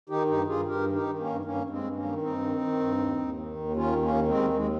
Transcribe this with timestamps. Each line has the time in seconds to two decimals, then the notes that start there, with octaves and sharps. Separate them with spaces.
0.09 D#3 D#4 G4
0.28 G2 D#4 G4
0.48 G2 F4 G#4
0.67 G2 G4 A#4
0.86 D#3
0.93 D#4 G4
1.06 D#3
1.19 A#3 C#4
1.25 G2
1.44 G2 A#3 C#4
1.64 G2
1.70 G#3 C4
1.83 G2
1.96 A#3 C#4
2.03 D#3
2.22 G2 C4 D#4
2.41 D#3
2.61 D#3
2.80 G2
2.99 D#2
3.18 D#2
3.38 D#3
3.57 D#2
3.76 D#3 C#4 F4
3.96 D#2
4.02 A#3 C#4
4.15 D#3
4.28 G#3 C4
4.34 D#2
4.54 D#2 G#3